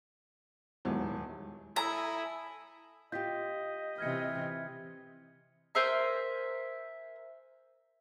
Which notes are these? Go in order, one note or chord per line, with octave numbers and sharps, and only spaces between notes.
D#1 E2 G#2 F#3 G#3
E4 A4 G#5 A#5 D#6
F4 G4 D#5 G6 B6
C3 E3 F6 G#6 C#7
A#4 C5 E5 G#5